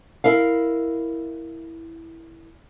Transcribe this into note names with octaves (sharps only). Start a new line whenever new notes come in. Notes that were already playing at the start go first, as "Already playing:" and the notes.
E4 A#4 F5